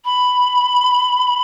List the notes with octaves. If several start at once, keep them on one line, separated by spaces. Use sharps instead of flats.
B5